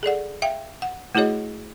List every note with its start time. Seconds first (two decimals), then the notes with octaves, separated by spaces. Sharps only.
0.03 G#4 A4 D5 F#5
0.42 E5 F5 G5
0.82 F#5
1.15 A3 E4 F#4 G#4 C#5 D#5